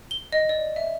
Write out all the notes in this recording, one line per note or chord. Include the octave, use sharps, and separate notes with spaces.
G7
D#5
D5
E5